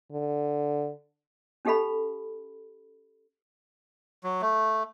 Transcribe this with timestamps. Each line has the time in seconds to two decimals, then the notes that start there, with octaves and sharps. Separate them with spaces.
0.11 D3
1.65 C#4 D#4 G4 A4 F5 B5
4.24 F#3
4.41 A3